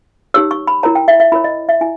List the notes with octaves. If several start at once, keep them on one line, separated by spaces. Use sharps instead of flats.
D#4 G4 C#5 E6
C#6
B5
E4 A#4 C#5 A#5
G5
E5
E5
E4 A#4 C#5 B5
D#5
E5
E4 G#5